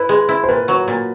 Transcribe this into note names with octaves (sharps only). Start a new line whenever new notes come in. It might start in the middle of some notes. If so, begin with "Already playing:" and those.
Already playing: E4 B4
G#3
E4
C5
A#2 B4
F#3
A#2